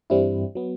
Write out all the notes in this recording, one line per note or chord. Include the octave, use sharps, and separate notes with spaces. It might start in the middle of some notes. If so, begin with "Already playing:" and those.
G2 E3 G3 C4 E4
F#3 B3